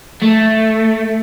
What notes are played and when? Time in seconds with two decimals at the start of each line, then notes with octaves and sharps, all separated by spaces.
0.22 A3